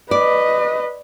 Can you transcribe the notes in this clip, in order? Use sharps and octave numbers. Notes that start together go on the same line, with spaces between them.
B4 D5 D#5